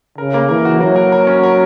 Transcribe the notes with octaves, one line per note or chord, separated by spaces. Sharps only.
C#3 A#4
A#3
E3 A#4
F#4
F#3 A#3
A#4
A#4
C#4
A#4